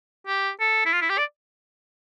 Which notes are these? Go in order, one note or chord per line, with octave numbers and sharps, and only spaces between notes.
G4
A4
E4
F4
E4
G4
D5